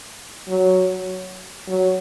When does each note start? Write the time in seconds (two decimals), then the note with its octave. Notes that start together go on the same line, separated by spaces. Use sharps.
0.48 F#3
1.68 F#3